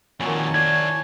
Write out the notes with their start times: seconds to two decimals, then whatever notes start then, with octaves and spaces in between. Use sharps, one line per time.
0.20 F2 A#2 D#3 A#3 F#4 C#5 G#5 A5
0.54 E4 D5 G#6